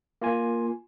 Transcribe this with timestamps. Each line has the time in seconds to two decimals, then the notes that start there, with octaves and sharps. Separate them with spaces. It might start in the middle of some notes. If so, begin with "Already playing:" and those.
0.22 A#3 F4 G#5